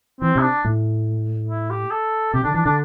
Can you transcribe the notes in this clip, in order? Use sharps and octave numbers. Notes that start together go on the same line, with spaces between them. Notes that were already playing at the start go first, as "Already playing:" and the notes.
E3 C4
C3 E4
D4
A2
E4
G4
A4
C3 G4
D3 D4
E3 D4
D3 D4